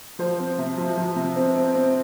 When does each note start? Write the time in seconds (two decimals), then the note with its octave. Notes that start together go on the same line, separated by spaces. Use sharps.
0.19 F3 C5
0.39 C4
0.58 C3
0.78 F3
0.97 F3
1.16 C3
1.36 C4
1.55 C4
1.75 C4